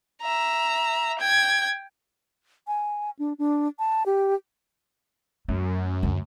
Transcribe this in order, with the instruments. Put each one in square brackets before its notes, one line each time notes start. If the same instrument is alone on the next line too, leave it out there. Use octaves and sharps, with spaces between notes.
[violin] E5 A#5
G5 G#6
[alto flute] G#5
D4
D4
A5
G4
[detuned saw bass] F#2 [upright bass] A3
[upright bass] D2